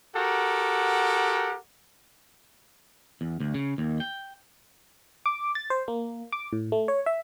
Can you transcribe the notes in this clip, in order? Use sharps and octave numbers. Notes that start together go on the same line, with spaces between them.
F#4 G4 A4 A#4 F#5
E2
D2
C#3
D#2
G5
D6
A6
C5
A#3
D6
A2
A3
C#5
E5